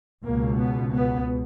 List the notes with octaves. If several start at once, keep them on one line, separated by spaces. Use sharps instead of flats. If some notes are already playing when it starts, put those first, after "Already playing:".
C#2 B2 A#3
B3
B3